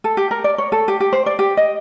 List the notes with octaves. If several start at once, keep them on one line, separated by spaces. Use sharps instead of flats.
A4
G4
A#4
D5
C#5
A4
G4
G4
C5
D5
G4
D#5